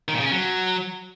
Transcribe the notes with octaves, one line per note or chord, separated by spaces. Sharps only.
D#3
A#2
C#3
C#4
F#3